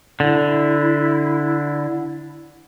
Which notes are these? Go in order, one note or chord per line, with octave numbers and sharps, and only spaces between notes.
D3 E4